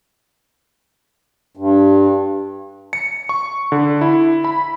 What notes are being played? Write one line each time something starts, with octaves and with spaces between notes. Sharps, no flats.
G2
C#7
C#6
D3
E4
B5